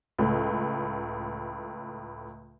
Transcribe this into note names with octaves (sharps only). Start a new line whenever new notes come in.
C#2 A2